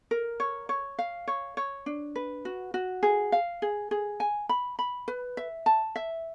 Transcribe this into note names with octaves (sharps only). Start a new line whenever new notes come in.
A#4
C#5
C#5
F5
C#5
C#5
D4
B4
F#4
F#4
G#4
F5
G#4
G#4
G#5
B5
B5
B4
E5
A5
E5